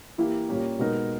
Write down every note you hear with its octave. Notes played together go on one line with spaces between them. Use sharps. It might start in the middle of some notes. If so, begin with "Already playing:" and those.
E3 A#3 E4 G4
A#2 G3 A#3 C#4 G4
B2 G#3 B3 D#4 A#4